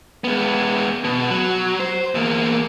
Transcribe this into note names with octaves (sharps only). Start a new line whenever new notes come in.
G#3 B3
B2
F#3
C5
E2 A#3